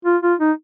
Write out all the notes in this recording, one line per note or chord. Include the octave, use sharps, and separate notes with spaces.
F4
F4
D#4